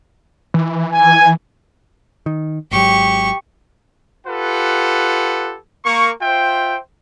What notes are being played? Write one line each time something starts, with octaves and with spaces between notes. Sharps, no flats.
E3
G#5
D#3
G#1 G#2 F#3 G4 C#6
F4 G4 A4 B4 F#5
A#3 C#6
F4 C5 E5 G5